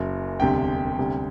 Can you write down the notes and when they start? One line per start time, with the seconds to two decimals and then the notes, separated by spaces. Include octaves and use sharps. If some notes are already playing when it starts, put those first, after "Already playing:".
Already playing: F#1 F#2 F#3
0.40 E1 D2 C3 G3 G5
0.98 D2 C3 G3